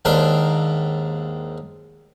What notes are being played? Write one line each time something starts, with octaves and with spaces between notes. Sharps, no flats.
D#2 G#2 D4 A#4 C6